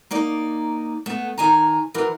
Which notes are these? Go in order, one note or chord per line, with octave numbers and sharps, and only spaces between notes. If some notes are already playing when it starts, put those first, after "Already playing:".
A#3 D#4 D5
A3 B3
D#3 G#5 A#5
E3 F#3 A#4